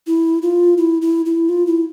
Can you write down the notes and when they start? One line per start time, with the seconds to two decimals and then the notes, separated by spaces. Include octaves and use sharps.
0.07 E4
0.42 F4
0.78 E4
1.02 E4
1.26 E4
1.49 F4
1.67 E4